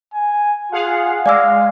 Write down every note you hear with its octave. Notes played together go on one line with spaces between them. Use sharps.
G#5
F4 G#4 F5 F#5
G#3 D5 F5 D6 E6